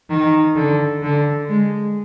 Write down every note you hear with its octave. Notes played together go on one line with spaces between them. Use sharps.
D#3
D3
D3
G#3